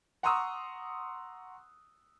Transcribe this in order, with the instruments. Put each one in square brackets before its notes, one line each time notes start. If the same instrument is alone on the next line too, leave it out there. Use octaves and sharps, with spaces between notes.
[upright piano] F#5 A#5 C6 C#6 D#6 E6